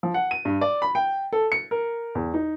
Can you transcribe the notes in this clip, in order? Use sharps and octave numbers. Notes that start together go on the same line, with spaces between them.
F3
F#5
D#7
G2
D5
B5
G5
A4
C#7
A#4
E2
D#4